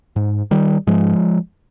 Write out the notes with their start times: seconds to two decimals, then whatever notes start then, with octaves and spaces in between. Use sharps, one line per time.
0.16 G#2
0.51 D#3 G3
0.87 G#2 F3 G#3